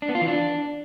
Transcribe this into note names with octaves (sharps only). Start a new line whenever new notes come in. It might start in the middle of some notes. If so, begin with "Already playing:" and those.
D4
B3
F4
E3
D4